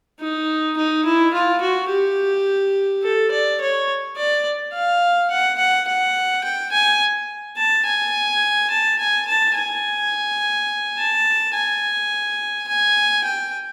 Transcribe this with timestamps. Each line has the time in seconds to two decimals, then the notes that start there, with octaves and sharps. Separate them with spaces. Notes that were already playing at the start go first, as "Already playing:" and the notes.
0.20 D#4
0.77 D#4
1.05 E4
1.33 F4
1.61 F#4
1.90 G4
3.03 A4
3.31 D5
3.60 C#5
4.17 D5
4.73 F5
5.31 F#5
5.58 F#5
5.87 F#5
6.44 G5
6.72 G#5
7.57 A5
7.85 G#5
8.70 A5
8.99 G#5
9.27 A5
9.55 G#5
10.98 A5
11.54 G#5
12.68 G#5
13.24 G5